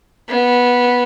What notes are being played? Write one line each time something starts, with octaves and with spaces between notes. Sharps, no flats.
B3